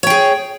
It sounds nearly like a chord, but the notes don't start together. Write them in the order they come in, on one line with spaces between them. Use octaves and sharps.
C#5 G5 G#4